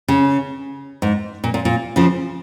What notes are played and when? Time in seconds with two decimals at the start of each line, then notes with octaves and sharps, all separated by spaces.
0.08 C#3
1.02 G#2
1.44 A#2
1.54 A#2
1.65 A#2
1.96 C#3 F3